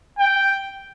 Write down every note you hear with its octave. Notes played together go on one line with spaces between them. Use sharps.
G5